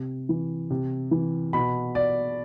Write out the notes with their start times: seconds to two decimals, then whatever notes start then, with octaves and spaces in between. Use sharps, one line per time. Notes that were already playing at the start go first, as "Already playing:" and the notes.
Already playing: C3
0.29 E3
0.70 C3
1.11 E3
1.53 B2 B5
1.95 D5